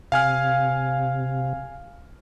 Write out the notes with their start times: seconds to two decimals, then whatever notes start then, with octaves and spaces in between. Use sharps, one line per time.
0.12 C3 F5 G#5 F6